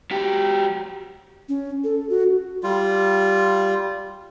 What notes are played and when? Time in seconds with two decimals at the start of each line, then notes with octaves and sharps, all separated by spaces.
0.11 F#3 G4
1.49 C#4
1.84 A4
2.10 F#4
2.63 G3 F4